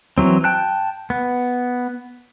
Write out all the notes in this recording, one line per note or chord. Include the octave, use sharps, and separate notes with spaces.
E3 F#3 C4
G5 A5 F#6
B3